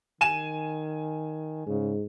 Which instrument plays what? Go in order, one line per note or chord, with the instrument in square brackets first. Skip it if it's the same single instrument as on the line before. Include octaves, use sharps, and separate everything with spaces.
[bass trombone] D#3 [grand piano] G#5 D#7 E7
[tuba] G#2 [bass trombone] C#3